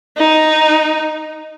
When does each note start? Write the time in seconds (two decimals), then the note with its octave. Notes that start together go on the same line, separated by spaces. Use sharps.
0.17 D#4